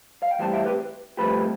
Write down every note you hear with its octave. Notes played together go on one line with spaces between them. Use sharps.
F5
G5
A2 E3 G3 C4 F5 A5
E5 G5
G4 B4
G2 D3 F3 A3 C4 G4 B4